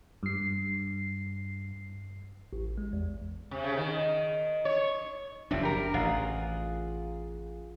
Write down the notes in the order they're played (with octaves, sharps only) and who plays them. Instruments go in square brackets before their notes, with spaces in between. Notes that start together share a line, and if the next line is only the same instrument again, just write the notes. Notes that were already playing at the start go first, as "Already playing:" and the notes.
[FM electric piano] G2 C7
[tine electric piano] A1
G#3
E2
[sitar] C3
C#3
D#3
C#5
[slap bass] F#1 F3 D4 [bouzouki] A3 C4
[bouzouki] G3 A#4
[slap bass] A1 [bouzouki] F4 G#4 F#5